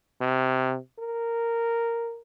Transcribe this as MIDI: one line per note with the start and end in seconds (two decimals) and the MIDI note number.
0.21 0.77 48
0.99 2.20 70